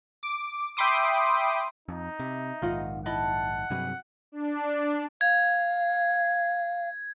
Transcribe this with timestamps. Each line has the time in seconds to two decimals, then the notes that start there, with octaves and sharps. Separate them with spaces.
0.23 D6
0.77 E5 G5 B5 C6 D6 D#6
1.88 F2 D#4
2.20 C3 E4
2.62 A#1 G#2 D#3 F4 D#5 F#5
3.06 E4 D#5 F#5 A5 B5
3.70 G2 C3 F#3 G#4 B4
4.32 D4
5.21 F5 G#6